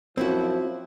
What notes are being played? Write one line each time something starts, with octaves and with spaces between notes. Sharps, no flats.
F#2 F3 C4 E4 F#4